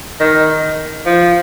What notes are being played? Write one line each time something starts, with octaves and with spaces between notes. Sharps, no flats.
D#3
F3